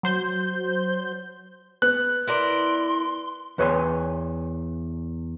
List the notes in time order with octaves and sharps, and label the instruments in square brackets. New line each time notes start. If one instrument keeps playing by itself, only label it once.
[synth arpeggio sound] F#3 C5 G6
[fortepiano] B3 [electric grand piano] F#6
[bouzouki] E4 A#4 D5 [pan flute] C6
[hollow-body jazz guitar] E2 B4 C#5 D#5 G#5 C6